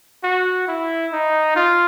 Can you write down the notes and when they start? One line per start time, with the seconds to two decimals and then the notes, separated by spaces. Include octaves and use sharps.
0.24 F#4
0.68 E4
1.13 D#4
1.56 F4